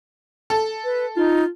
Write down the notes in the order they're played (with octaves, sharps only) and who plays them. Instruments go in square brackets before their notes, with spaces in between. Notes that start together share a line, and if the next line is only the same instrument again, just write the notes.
[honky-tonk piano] A4
[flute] B4
[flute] D#4 [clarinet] F4